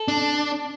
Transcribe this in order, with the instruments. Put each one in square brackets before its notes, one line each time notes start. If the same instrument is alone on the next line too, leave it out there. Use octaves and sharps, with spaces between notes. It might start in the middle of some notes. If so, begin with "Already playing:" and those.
Already playing: [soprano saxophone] A4
[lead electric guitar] D4